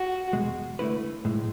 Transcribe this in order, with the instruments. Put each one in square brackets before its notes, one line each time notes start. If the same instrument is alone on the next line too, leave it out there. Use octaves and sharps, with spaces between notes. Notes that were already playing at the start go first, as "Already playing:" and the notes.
Already playing: [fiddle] F#4
[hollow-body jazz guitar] E2 B2 G#3
D3 A3 E4 B4
B1 A2 G#3